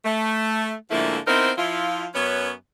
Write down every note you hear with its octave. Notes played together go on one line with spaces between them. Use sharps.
A3
G#2 D3 F3 A3 A#3 E4
B3 C4 D#4 E4 A#4 C5
F3 E4 F4
F#2 B3 C#4 B4 C#5